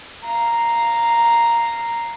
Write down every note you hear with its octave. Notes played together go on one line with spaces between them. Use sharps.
F5 A#5